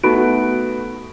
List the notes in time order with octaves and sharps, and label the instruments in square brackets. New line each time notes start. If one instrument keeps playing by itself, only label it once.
[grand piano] A3 B3 F#4 [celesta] D#4 B5 D7